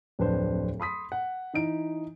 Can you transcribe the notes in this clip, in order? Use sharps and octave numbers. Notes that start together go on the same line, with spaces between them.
D1 F2 D4 B4 C5
B5 C6 D#6 B6
F#5
E3 D#4 D7